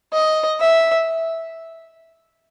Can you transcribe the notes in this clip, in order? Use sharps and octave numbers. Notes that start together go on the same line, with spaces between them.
D#5
E5